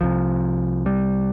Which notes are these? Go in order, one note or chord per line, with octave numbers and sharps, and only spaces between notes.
C2 C3 F3
G3